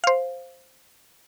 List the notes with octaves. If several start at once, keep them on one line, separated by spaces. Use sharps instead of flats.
C5 F5